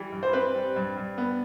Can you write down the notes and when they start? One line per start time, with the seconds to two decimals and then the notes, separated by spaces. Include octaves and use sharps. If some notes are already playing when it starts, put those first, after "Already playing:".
Already playing: E3 G3
0.12 G2
0.23 C5
0.33 C4 B4
0.55 G3
0.76 G2
0.97 G2
1.18 B3